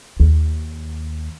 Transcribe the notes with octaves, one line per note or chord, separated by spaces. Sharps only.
D#2